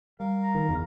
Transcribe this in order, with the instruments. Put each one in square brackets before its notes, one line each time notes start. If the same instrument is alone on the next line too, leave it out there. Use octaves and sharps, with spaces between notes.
[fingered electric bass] G3 [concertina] A#4 F5
[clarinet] A#5
[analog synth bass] D#3
[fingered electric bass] F#1 [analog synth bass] E2